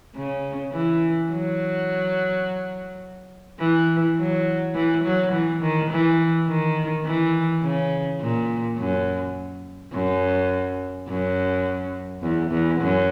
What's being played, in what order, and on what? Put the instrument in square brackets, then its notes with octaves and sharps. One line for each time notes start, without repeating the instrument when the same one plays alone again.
[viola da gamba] C#3
E3
F#3
E3
F#3
E3
F#3
E3
D#3
E3
D#3
E3
C#3
A#2
F#2
F#2
F#2
E2
E2
F#2